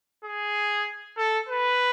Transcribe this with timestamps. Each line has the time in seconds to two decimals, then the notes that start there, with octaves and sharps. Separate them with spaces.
0.24 G#4
1.17 A4
1.49 B4